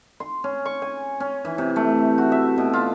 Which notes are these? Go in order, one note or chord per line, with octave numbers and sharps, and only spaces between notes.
C6
C#4
C#6
G#5
C#4
E3
C3
A3
F#4
E5
B2
F4